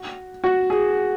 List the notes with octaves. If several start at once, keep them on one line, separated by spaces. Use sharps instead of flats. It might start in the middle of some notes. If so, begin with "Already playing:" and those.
Already playing: F#4
F#4
G#4